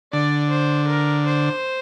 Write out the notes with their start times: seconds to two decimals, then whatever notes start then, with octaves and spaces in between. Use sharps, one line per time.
0.12 D3 D5
0.50 C5
0.88 A#4
1.26 C5